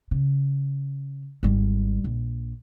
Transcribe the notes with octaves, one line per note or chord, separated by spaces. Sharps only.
C#3
G#1 G3
A#1